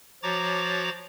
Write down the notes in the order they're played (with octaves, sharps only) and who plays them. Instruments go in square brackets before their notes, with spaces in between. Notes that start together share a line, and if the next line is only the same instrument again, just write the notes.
[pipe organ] F3 F#4 C#5 A#5 D6 A6